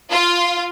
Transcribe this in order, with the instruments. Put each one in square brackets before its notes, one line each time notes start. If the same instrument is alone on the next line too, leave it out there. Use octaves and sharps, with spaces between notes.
[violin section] F4